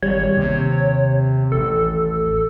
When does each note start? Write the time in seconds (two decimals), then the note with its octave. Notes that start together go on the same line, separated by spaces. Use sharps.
0.02 G#1 G3 C#5
0.37 D#2 C3
1.52 A1 A4